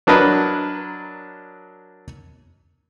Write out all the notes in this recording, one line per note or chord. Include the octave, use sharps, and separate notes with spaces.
F#3 D4 A#4 B4 D#5